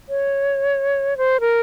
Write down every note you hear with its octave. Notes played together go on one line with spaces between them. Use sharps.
C#5
C5
A#4